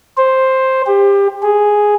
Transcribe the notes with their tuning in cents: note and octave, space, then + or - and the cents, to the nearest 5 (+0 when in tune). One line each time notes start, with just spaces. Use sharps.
C5 +5
G4 +30
G#4 +0